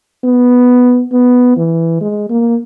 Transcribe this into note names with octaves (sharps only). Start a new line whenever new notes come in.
B3
B3
E3
G#3
A#3